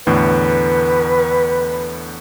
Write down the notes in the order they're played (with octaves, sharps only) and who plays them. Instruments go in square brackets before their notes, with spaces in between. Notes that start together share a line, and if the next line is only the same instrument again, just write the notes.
[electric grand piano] E2 A2 D3 [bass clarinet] B4